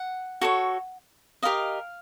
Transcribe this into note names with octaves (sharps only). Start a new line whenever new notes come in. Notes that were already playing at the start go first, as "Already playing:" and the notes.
Already playing: F#5
F#4 A4 C#5
G4 A#4 D#5 F5